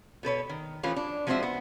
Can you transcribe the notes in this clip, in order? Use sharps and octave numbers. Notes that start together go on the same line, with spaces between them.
B2 A4 B4 C#5
D#3
E3 F3 A3 C#4 F4 B4
D4
F3 G#3 C4 F#4 C5 E5
B3